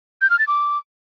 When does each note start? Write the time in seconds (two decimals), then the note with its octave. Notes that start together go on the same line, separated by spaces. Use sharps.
0.22 G6
0.30 F6
0.39 A6
0.48 D6